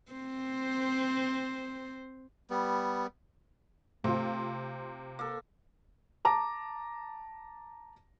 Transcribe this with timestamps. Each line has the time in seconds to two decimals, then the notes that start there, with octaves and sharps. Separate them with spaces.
0.12 C4 C5
2.50 G3 B3
4.04 C3 A3 F4 C5
5.19 A#3 A4
6.25 A5 A#5 D6